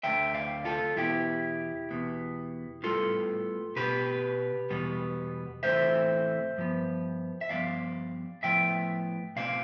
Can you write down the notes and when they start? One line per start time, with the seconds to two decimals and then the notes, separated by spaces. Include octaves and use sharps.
0.03 D2 D3 A3 E5 G5
0.34 D5 F5
0.65 F4 A4
0.96 E2 B2 B3 E4 G4
1.91 E2 B2 B3
2.83 A2 G3 B3 F4 A4
3.76 B2 B3 G4 B4
4.70 E2 B2 G3 B3
5.63 A2 E3 A3 C4 C5 E5
6.57 G2 F3 B3
7.41 E5
7.49 G2 F3 B3 D5 F5
8.43 A2 F3 B3 E5 G5
9.36 B2 A3 C4 D5 F5